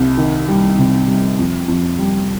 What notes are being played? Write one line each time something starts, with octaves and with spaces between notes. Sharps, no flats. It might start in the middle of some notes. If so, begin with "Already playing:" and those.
Already playing: C2
D#3
G3
C3
G3
F2
F2
G3